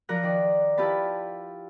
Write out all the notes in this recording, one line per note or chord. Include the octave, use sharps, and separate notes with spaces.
F3 A#4 D5 A#5 F#6
D#3 D5
E4 F4 G4 B4 A5 B5